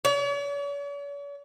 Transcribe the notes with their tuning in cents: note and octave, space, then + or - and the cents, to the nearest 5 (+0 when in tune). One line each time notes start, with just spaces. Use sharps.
C#5 +45